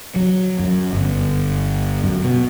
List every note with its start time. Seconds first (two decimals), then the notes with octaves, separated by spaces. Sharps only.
0.16 F#3
0.59 F#2
0.93 G1
2.04 F#2
2.23 B2